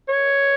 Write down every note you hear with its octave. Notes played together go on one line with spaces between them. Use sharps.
C#5